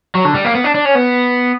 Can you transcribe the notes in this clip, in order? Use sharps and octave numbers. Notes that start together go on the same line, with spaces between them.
F#3
D3
G3
A#3
B3
D4
D4
C#4
B3